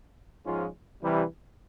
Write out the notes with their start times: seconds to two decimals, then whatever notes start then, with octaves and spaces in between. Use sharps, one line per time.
0.45 G#2 F3 G#3 C#4 F4
1.02 C3 E3 G3